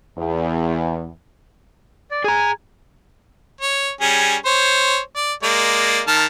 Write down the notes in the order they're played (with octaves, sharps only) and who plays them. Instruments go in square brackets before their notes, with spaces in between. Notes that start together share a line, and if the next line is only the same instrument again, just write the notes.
[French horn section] E2
[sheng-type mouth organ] D5
[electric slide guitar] G#4 A#5 [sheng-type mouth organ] G#5
[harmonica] C#5
G3 C#4 G#4
C5 C#5
D5
G#3 A#3 D5
D#3 A5 F6